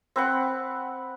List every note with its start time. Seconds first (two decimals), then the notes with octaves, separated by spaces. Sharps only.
0.16 C4 B4 F#5